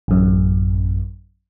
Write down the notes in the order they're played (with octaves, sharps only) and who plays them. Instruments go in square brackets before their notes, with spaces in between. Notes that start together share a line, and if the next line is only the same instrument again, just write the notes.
[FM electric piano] A1 F#2